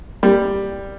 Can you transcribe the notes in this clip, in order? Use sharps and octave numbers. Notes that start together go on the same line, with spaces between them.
G3